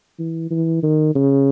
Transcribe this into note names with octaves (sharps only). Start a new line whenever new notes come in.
E3
E3
D#3
C#3